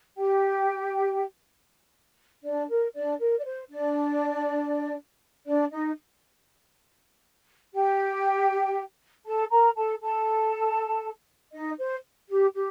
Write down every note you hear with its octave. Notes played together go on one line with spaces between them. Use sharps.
G4 G5
D4 D5
A#4
D4 D5
A#4
D5
C5
D4 D5
D4 D5
D#4 D#5
G4 G5
A4 A5
A#4 A#5
A4 A5
A4 A5
D#4 D#5
C5
G4
G4